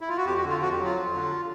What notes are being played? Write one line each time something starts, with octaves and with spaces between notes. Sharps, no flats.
E4
F4
F#4
F2 G4
F#4
D3
F4
F2 F#4
G4
F#3
F4
F2
D3